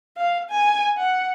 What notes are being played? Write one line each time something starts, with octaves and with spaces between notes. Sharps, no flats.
F5
G#5
F#5